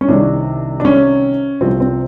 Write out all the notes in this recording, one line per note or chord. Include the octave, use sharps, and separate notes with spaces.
C#4
C2 C3 D#3 D4
D4
C#4
C2 C3 F3 C4
C4